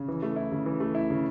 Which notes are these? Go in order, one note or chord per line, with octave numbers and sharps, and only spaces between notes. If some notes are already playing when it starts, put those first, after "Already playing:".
Already playing: C#3
E3
A3
E4
C#3
E3
A3
E4
C#3